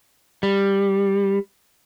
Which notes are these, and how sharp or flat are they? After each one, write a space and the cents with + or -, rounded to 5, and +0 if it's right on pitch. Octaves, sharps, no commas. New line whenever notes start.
G3 +10